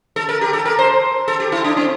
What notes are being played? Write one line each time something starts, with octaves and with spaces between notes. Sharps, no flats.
A4
A#4
G4
A4
A#4
C5
A4
G4
E4
D4
C4